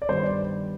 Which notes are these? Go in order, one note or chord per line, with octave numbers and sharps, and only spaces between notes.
D5
G2 D#3 G3 B3 C5
D5